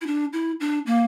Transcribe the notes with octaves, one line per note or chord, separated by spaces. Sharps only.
E4
D4
E4
D4
A#3